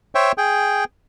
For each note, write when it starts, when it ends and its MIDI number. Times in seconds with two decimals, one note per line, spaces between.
0.15 0.32 72
0.15 0.32 73
0.15 0.32 76
0.15 0.32 79
0.38 0.84 68
0.38 0.84 79